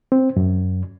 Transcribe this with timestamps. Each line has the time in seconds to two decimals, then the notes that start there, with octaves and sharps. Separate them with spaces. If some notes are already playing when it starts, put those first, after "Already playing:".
0.12 C4
0.36 F#2